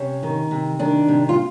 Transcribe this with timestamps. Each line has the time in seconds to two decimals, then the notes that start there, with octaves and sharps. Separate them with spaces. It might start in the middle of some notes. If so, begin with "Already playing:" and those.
Already playing: C3 C#4
0.23 D#3
0.51 C3
0.79 D#3 D4
1.08 C3
1.29 F4